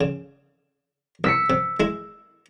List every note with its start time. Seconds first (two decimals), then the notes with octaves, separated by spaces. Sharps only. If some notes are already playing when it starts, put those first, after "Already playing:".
0.01 C#3
1.24 C2 E6 B6 C#7
1.50 C3
1.80 G#3 E4